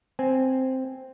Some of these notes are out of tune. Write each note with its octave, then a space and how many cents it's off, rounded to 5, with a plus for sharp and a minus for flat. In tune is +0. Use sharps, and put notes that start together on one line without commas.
C4 +0 G#5 +0